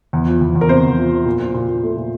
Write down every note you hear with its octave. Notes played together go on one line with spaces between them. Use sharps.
E2
F3
E2
E2
A#4
C3 C5
E2
F3
F3
A#2
A#2
A#2
A#2
A3
A#2